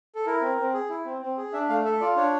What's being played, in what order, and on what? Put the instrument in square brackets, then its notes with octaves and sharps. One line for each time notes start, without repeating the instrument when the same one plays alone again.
[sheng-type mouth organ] A4
E4 A#4
C4
C4
G#4
E4
C4
C4
G#4
D4 E5
A3 F5
A4 E5
F4 D5
D4 C#5